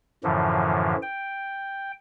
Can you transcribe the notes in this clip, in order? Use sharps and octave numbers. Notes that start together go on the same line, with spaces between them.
F#2 A2 D3 E3 F3
G5